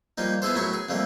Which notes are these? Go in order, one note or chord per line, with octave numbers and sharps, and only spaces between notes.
F3 G3 A#3 D#4
B3 E4 G#4 A4 C5
A2 F#3 E4 A#4 C#6
G#4
F2 F3 G3 A3 A#3